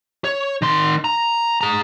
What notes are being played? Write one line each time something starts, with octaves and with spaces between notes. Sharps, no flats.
C#5
D#3 C6
A#5
G#4 A#5